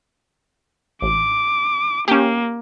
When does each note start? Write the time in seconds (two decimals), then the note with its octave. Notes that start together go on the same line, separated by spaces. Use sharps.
1.02 A1 D6
2.08 A#3 C#4 G4